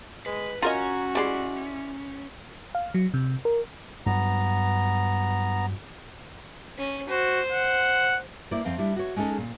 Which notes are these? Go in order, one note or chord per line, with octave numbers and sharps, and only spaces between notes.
G#3 B4
C#4 F4 F#4 A#4 D#5 G#5 A#5
G3 G#3 E4 D5 C6
F5
F#3
C3
A#4
G2 F#3 B3 A#5
C#4
F#4 C5
F#5
A#3 E4 C5 D5
F2 C4 F5
G3 D4 E4
F#4 C#5
G#3 C#4 D#4 G#4 A4
A#2